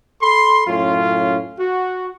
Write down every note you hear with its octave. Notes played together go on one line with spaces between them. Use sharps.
A4 B5 C6
F#2 A2 C#4 F4
F#4